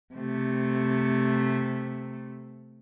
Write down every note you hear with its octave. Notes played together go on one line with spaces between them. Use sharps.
C3 A3